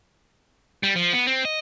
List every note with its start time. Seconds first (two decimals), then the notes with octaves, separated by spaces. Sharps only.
0.83 G3
0.96 F3
1.13 B3
1.27 C4
1.45 D#5